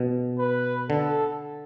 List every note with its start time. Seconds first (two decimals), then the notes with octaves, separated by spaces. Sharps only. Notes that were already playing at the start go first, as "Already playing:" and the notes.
Already playing: B2
0.38 B4
0.89 D3 A4